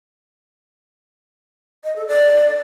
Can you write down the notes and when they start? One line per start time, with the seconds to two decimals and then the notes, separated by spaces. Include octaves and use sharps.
1.84 D#5
1.96 A4
2.08 D5